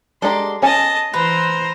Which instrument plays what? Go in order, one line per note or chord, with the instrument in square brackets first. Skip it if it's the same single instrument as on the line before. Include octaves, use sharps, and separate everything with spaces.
[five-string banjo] G#3 D4 G4 [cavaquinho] A4 A#5 [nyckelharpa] C6
[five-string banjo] C#4 G#5 [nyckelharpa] D#5 A5
[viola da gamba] E3 C5 [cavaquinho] B4 [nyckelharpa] A#5